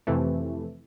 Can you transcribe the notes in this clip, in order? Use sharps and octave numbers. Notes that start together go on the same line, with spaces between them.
F2 C3 E3 A3